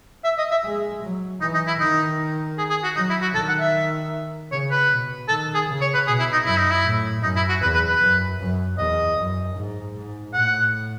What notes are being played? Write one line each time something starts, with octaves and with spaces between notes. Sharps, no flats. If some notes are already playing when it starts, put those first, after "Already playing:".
E5
D#5
E5
G#3
F#3
E3 D#4
D#4
E4
D#3 D#4
G#4
G#4
F#4
F#3 D#4
E4
F#4
D#3 A4
F#5
E5
C#3 C#5
B4
B2
D#3 A4
G#4
C#3
C#5
B4
B2 G#4
E4
D#4
F#2 E4
D#4
E4
A2
F#2 D#4
E4
F#4
E2 B4
B4
B4
F#2
F#2
E2 D#5
F#2
G#2
G#2
A2 F#5